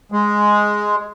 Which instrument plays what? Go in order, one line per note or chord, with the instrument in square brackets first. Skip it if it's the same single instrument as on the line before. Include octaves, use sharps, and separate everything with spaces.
[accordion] G#3